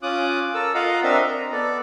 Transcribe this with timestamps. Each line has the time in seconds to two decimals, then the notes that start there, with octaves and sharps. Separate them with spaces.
0.03 C#4 F4 D6 D#6 F#6
0.54 A4 A#4 E6
0.74 F4 D#5 F5 F#5 A#5
1.03 C4 D4 A#4 D#5 E5
1.22 A#5
1.52 B3 A4 D5